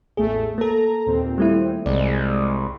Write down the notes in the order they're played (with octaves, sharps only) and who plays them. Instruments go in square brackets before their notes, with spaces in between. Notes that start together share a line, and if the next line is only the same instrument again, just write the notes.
[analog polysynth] A1 E2 A3 [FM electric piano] G#4
[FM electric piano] A#3 A4 [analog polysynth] A#5
[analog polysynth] D#2 A#2 C4
[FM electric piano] G3 A3 E4
[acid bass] C2 [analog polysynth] G#3 [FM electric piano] D5